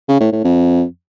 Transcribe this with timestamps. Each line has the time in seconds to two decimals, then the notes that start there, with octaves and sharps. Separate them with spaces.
0.08 C#3
0.20 A2
0.32 A2
0.44 F2